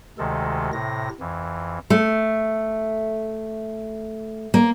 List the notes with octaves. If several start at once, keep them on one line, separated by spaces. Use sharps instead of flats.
D2 C3 D#3 G#3 A4
A2 C3 A#6
F2 E3
A3
A#3